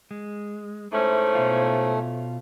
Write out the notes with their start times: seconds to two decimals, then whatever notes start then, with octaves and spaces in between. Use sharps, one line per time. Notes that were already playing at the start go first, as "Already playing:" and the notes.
0.11 G#3
0.92 G#2 A3 C#4 E4 C5
1.35 B2 F4